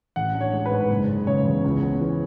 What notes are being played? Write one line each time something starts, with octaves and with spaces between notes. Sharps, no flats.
A1 F#5
D4
C#5
G#3
B4
G#2
F#1
G#3
C#3 C#5
E2
C#2
B3
E3